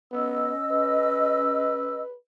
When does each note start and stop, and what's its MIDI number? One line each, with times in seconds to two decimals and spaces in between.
0.12 0.53 59
0.12 2.01 61
0.12 2.01 75
0.12 2.01 88
0.71 2.15 71